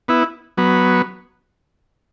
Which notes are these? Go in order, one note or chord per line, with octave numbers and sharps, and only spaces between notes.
B3 E4
F#3 B3